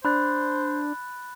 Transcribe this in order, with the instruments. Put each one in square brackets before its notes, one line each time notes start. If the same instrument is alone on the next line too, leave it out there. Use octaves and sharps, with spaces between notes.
[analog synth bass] D4 [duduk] C5 [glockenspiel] B5 F#6 A6